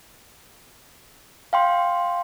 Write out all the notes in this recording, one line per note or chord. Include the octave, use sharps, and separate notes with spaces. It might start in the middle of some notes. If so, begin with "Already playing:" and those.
F5 G5 C6